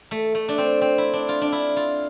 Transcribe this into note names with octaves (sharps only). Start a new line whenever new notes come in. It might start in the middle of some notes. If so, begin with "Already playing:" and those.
A3
A3
D4
C4
C4
E4
D4
F4
D4
E4
F4